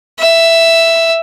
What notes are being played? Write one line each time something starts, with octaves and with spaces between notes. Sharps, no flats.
E5